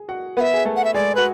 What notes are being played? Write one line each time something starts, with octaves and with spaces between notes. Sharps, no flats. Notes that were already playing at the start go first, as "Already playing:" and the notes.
Already playing: G#4
F#4 F#5
B3 B4 F#5
E5
G#4
A3 A4
F#5
E5
G#3 G#4 D5
F#4 B4